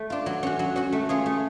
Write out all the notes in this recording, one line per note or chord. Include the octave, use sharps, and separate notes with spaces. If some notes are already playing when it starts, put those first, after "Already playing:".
Already playing: A3
D4 F4
F#3
C#4 F#4
F#3
C#4 F#4
A3
C#4 F4 G#4
A3